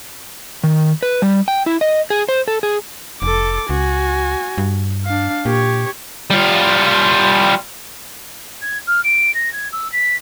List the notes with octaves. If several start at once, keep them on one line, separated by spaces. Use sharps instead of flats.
D#3
B4
G3
G5
E4
D#5
G#4
C5
A4
G#4
F1 A4 D6
C#2 F#4 G#5
G2
D4 F5
A#2 G4 C#5
G3 F4
G#6
F6
D7
A#6
G#6
E6
B6